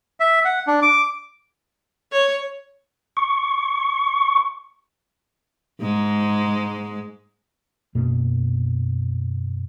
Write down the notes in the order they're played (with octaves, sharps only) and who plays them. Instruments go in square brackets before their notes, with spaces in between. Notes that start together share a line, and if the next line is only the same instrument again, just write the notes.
[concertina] E5
F#5
D4
D6
[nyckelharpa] C#5
[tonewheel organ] C#6
[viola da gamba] G#2 G#3
[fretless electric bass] F#2 B2 A#3